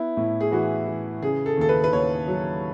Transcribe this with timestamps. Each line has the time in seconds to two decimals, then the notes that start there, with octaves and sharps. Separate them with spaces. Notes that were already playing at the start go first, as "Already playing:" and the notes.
Already playing: B3 E4
0.17 A2
0.40 G#4
0.51 E3 F#4
0.87 E3
1.22 C#3 G#4
1.46 A4
1.57 D#2 A4
1.69 B4
1.84 B4
1.92 D#2 C#5
2.28 F#3